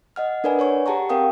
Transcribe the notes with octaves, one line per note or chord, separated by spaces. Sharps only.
D#5 F#5 F6
D4 A#4 B4 D5 F#5 G#5
C#5 G#5 C#6
G4 G#4 F#5 A5 A#5 C#6
C4 A#4 F5 G5 D#6